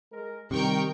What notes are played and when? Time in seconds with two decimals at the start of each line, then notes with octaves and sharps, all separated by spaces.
0.12 G#3 A#4
0.51 C3 D#3 G3 A#4 G5 C#6